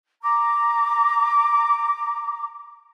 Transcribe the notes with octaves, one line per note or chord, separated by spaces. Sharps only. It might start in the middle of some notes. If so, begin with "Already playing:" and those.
A#5 D6